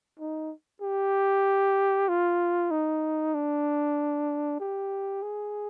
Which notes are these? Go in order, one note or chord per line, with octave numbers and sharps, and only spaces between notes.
D#4
G4
F4
D#4
D4
G4
G#4